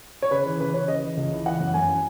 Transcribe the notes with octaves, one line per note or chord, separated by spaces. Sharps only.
C#5
C#3 B4
E3
C#3 B4
C#3 C#5
C#3 D#5
E3
C#2
E3
E3 F#5
F#2
F#2 G#5